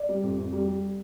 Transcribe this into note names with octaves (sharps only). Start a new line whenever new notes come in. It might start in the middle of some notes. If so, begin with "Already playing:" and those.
Already playing: D5
G3
F2
F2
G3
G3